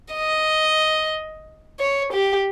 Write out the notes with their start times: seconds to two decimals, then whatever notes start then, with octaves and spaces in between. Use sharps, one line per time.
0.13 D#5
1.79 C#5
2.13 G4